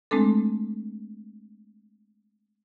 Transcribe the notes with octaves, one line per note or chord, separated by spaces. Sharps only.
G#3 A3 C4 D4 A4